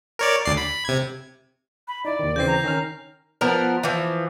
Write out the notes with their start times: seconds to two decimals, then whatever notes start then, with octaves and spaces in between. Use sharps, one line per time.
0.19 A#4 C#5 D5
0.45 D2 D5 C7
0.57 B5
0.85 C3 G#6
1.88 B5
2.05 D#4 E4 D5
2.19 D#2 D#3
2.36 C#3 E3 C4 G6 A#6 C7
2.47 A#5
2.64 D#3 C#4 F6
3.41 F3 B3 A#4
3.83 E3 F3